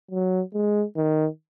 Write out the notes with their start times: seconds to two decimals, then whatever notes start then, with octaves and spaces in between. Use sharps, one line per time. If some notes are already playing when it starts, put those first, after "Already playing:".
0.11 F#3
0.54 G#3
0.97 D#3